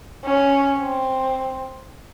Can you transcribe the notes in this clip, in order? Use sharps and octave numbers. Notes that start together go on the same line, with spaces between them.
C#4
C4